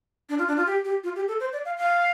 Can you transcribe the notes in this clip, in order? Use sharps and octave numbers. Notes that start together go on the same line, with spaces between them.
D4
F4
D4
F4
G4
G4
F4
G4
A4
C5
D5
F5
F5